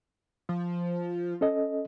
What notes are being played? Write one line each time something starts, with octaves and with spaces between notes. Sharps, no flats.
F3
C#4 A4 D#5